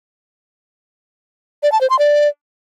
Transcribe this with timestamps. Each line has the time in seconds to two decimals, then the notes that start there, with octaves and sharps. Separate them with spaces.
1.63 D5
1.72 A5
1.81 C5
1.90 C6
1.99 D5